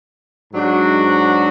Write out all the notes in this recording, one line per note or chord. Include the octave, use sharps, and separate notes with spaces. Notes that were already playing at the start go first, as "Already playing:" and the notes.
G#2 F#3 D4 F#4